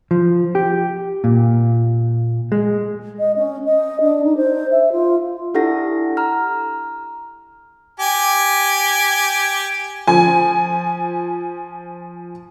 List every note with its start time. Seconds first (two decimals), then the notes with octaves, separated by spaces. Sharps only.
0.11 F3
0.55 G4
1.24 A#2
2.52 G#3
3.19 D#5
3.36 C#4
3.65 D#5
4.00 D4
4.23 D#4
4.36 C5
4.71 E5
4.92 F4
5.54 D4 E4 G4 A4 F#5 A#6
6.17 A#5 F6
8.00 G4 G#5
10.08 F3 G#5